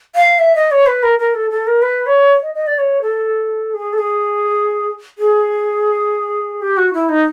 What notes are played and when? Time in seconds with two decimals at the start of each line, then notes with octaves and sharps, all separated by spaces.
0.15 F5
0.39 E5
0.55 D#5
0.71 C#5
0.86 B4
1.03 A#4
1.19 A#4
1.34 A4
1.51 A4
1.67 A#4
1.82 B4
2.06 C#5
2.42 D#5
2.55 D#5
2.67 D5
2.79 C#5
3.02 A4
3.74 G#4
3.93 A4
3.98 G#4
5.18 G#4
6.62 G4
6.77 F#4
6.93 E4
7.09 D#4